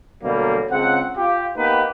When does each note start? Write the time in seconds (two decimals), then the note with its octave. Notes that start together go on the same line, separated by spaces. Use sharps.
0.23 B2 D3 F#3 G3 A#3
0.72 C#2 C#3 C4 F#5
1.17 F4 G4
1.57 A#3 B3 D#4 G4 B4